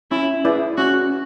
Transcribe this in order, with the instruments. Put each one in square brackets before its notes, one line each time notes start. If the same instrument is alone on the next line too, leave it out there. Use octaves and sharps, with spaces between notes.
[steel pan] C#4 [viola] E4
[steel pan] E4 B4 D5 [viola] G#4
[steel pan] C#4 [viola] F#4